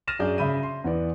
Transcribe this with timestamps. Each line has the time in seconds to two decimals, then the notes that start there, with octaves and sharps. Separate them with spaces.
0.08 F6 A6 A#6 D#7 E7
0.19 F#2 D4 G#4 D5 G6
0.38 C#3 E5 B5 G6 D#7
0.63 C6
0.84 E2 E3 B3 D5